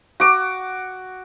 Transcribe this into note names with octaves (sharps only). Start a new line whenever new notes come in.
F#4 D6